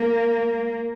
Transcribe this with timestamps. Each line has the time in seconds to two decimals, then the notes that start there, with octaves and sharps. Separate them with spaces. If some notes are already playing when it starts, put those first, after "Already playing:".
Already playing: A#3